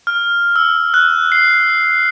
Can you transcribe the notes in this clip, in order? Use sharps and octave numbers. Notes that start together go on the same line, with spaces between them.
F6
E6
F#6
C7